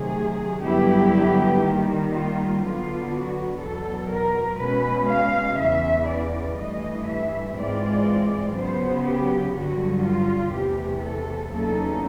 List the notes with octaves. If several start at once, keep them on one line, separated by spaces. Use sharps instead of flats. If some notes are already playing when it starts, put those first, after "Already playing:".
Already playing: C3 D#3 F#3 A3 G#4
G2 D3 F#3 B3 E4 G4
D#3 G3 A#3
F4
D3 F#3 B3 D4 F4
F#4
E2 B2 F#3 A4
A#4
B2 G#3 C#4 B4
F5
E2 C#3 E3 E5
D5
G2 E3 A3 D#5
E5
G#2 E3 G#3 C4 F4 D5
C#3 F#3 B3 C5
G4
G2 D3 F#3 F#4
F4
E2 C3 E3 A3 G4
A4
E2 C#3 F#3 A#3 D#4 A4